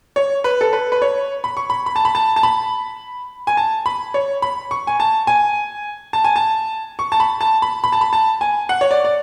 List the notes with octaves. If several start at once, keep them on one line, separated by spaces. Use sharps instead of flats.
C#5
B4
A4
B4
B4
C#5
B5
C#6
B5
B5
A5
B5
A5
A5
B5
G#5
A5
B5
C#5
B5
C#6
G#5
A5
G#5
A5
G#5
A5
C#6
A5
B5
A5
B5
B5
A5
B5
A5
G#5
F#5
C#5
D5
D5